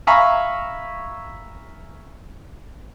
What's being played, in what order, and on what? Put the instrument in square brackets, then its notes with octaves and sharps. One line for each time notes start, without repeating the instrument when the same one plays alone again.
[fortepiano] E5 F5 G#5 A#5 B5 C#6